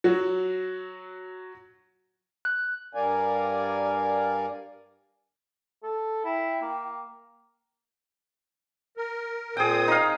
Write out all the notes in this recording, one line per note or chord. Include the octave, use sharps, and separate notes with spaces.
F#3 F#4
F#6
G2 G3 A#4 D5 F5 G#5
A4
E4 G5
A#3
A#4
A#2 C4 G#4 G5 D#6
D#4 F5